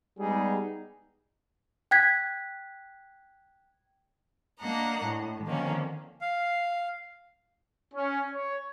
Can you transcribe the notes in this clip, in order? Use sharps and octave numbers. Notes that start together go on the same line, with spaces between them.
G3 G#3 B3 D#4 G#4
G5 F#6 G#6 B6
A#3 D4 D#5 F#5 A#5
A2
D3 D#3 F3 A#3 C4 C#4
F5
C#4
C#5